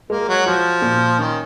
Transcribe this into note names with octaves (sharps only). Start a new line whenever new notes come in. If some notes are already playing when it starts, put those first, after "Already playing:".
G#3 A#3
F#3
F3 F#4
A#2
D#3 C#4